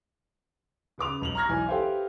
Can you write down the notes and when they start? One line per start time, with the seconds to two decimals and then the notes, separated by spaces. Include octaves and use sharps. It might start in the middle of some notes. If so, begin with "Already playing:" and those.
0.98 C#3 B4 D6 F7
1.21 B1 F7 F#7
1.35 A#5 C#6 F6 G#6 A#6
1.49 B1 E3 G#5
1.67 G4 A4 B4 C5 E5 F5